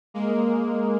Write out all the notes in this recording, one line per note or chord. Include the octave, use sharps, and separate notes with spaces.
G#3 A#3